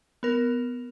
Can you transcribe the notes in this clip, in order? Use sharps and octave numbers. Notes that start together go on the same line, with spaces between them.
B3 A#4